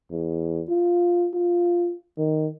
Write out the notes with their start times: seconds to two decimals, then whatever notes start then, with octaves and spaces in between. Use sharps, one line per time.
0.11 E2
0.69 F4
1.34 F4
2.18 D#3